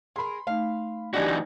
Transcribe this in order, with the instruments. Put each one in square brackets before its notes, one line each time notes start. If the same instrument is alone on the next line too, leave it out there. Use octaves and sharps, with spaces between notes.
[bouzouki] G#4 A#4 [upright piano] B5 C6
[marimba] A3 D#4 [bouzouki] F5
[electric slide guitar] E3 D#4 F#4 [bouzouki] G3 G#3 [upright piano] D4 G#5 [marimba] D5